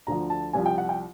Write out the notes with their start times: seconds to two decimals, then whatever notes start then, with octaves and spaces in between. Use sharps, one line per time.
0.07 D2 D3 F3 A#5
0.30 A5
0.53 C2 C3 F3 G#5
0.66 G5
0.78 F#5
0.89 G5